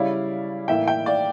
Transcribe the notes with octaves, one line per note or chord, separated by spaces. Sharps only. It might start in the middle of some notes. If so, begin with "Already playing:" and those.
Already playing: C#3 G3 C#4 E4 D5 F5
A2 E3 A#3 E5 G5
E5 G5
D5 F5